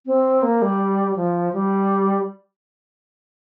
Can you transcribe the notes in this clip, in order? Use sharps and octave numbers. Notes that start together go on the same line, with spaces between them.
C4
A#3
G3
F3
G3